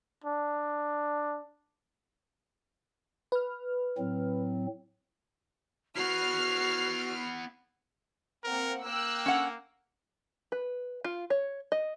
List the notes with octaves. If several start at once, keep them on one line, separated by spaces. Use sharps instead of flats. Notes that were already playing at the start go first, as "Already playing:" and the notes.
D4
B4 F6
A2 F#3 C4
B3 E4 F#4 F6 C7
A#3 C4 A#4 F#5
A#3 G5 E6 F#6
C#4 F#5
B4
F4
C#5
D#5